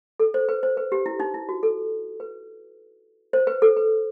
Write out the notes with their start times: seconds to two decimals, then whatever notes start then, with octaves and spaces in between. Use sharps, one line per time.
0.20 A4
0.34 C5
0.49 B4
0.63 C5
0.77 B4
0.92 G4
1.06 E4
1.20 D#4
1.34 E4
1.49 F#4
1.63 A4
2.20 B4
3.33 C5
3.47 B4
3.62 A4
3.77 B4